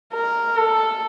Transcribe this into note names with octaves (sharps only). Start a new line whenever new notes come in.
A#4
A4